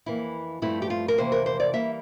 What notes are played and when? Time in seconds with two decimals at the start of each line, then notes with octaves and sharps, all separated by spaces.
0.06 F2 E3 A#3 E4
0.62 G2 F3 A3 C4 E4
0.82 G4
0.90 F4
1.08 A#4
1.18 F2 C3 E3 A#3 C5
1.32 A#4
1.46 C5
1.60 D5
1.73 E3 G3 A#3 E5